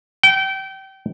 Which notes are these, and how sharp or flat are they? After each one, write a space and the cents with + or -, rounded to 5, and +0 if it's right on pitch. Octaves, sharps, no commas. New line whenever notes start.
G5 -25